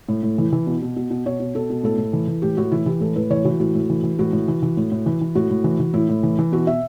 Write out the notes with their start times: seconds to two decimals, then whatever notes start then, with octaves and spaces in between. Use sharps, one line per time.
0.09 A2
0.23 A2
0.38 E3
0.53 E3
0.67 B2
0.82 B2
0.96 B2
1.11 B2
1.26 B2 C#5
1.40 B2
1.55 B2 A4
1.70 B2
1.83 A2 A4
1.98 A2
2.13 E3
2.28 E3
2.42 A2 G4
2.57 A2 F#4
2.72 E3 E4
2.86 E3 G4
3.01 A2 A4
3.16 A2 B4
3.30 E3 C#5
3.44 E3 F#4
3.60 A2 F#4
3.75 A2
3.90 E3
4.04 E3
4.19 A2 F#4
4.33 A2
4.48 E3
4.62 E3
4.77 A2
4.92 A2
5.06 E3
5.21 E3
5.35 A2 F#4
5.50 A2
5.64 E3
5.80 E3
5.94 A2 E4
6.09 A2
6.23 E3
6.39 E3
6.52 B2 F#4
6.67 B2 E5